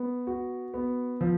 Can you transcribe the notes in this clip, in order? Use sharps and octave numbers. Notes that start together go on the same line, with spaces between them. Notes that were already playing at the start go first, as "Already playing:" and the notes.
Already playing: B3
F#4
B3
F3